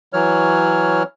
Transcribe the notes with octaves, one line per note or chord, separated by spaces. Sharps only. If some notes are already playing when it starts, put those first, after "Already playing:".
E3 F#3 C#5 F6